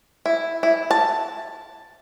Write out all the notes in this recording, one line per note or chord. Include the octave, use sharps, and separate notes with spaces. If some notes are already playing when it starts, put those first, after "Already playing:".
E4
E4
A5